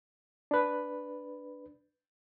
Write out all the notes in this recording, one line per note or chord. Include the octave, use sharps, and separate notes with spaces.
D4 B4